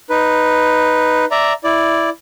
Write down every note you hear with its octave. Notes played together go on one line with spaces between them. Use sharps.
D#4 B4
D5 E5 A#5
E4 D5